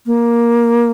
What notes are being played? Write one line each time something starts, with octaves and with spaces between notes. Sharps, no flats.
A#3